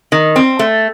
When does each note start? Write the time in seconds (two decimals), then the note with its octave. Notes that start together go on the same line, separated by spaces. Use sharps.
0.12 D#3
0.36 C4
0.59 A3